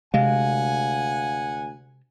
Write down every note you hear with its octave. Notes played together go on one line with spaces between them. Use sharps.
D2 C3 G#3 F5 F#5 G#5